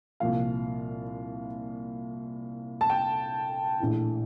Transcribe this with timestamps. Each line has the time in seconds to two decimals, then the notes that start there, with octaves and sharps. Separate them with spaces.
0.20 C2 A#2 F3 F5
2.81 A5
2.90 G5
3.80 A#1 A2 E3